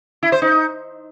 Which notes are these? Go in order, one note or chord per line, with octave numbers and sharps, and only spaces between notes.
E4
C5
D#4